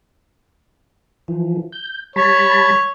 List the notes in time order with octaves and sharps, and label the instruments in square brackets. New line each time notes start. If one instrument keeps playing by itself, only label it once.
[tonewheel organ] E3 F3
G6
[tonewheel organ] G3 A5 B5 [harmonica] C#5